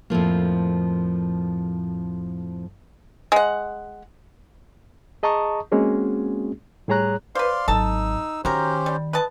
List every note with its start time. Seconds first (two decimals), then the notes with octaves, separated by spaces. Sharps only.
0.10 F2 A2 F3 A#3
3.32 G#3 F#5
5.23 G#4 D#5 A5 A#5 C#6 D#6
5.72 G#3 A#3 C4 C#4 F#4 G#4
6.88 A2 G3 G#4 C#5 A#5 F#6
7.35 B4 C5 D5 F5 C6
7.68 G#1 F#3 D#4 A4 A5 E6
8.45 D#3 F#3 C#4 G4 A#4 C5
8.86 G3
9.13 B4 D#5 A5